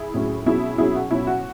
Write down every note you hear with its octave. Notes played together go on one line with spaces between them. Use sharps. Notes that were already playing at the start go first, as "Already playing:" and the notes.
Already playing: E4 G#4
A2 F#3 C#4
B2 F#3 C#4 E4 G#4
B2 F#3 C#4 E4 G#4
F#4
B2 F#3 C#4 E4
F#4